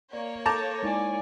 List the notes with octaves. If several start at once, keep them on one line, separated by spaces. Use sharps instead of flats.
A#3 C#5 D5
A4 A5 A#5 D6 G6
G#3 D#4 E4 D5 G#5